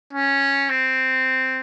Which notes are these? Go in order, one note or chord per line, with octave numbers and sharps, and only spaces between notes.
C#4
C4